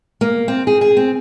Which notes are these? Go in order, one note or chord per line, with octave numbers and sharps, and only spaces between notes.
A#3
C4
G#4
G#4
C4